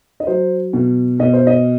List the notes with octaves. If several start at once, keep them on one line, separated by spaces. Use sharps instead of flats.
D#5
F#3 C5
B2
B2 D#5
C5
D#5